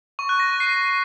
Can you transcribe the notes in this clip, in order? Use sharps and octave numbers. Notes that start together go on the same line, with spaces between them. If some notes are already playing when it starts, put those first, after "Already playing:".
C#6
F#6
A#6
D#7
C7